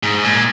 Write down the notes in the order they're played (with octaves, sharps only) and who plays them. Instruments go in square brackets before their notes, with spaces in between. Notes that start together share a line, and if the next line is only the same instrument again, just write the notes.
[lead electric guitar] G#2
A#2